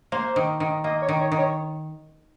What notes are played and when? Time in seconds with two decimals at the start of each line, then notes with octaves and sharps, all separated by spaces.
0.12 A#3 C5
0.36 D#3
0.60 D#3
0.84 A#3 D#5
1.02 C#5
1.09 D#3
1.20 C#5
1.32 D#3
1.38 C#5